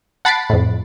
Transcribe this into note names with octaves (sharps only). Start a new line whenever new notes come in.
F#5 A5 B5 A6 C7 D7
F2 A2